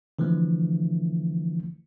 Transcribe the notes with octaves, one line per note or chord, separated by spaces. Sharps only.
D3 E3 F3 A3